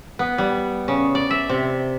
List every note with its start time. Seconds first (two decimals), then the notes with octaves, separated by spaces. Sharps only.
0.19 B3
0.38 G3
0.88 C#3
1.15 D5
1.31 E5
1.49 C3